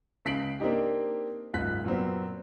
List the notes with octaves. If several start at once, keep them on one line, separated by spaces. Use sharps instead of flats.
C#2 C#3 B6 C7 D7 F#7
A#3 C4 D4 D#4 G4
F#1 G#2 F4 F#6 B6
F#2 A#2 F#3 B3 C4